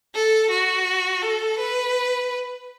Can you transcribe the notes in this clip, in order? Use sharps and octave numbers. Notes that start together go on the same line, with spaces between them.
A4
F#4
A4
B4